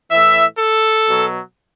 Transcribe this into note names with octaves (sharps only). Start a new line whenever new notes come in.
A2 E3 E5
A4
B2
F#3